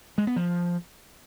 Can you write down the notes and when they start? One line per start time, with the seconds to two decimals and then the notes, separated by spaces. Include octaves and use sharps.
0.18 G#3
0.27 B3
0.36 F3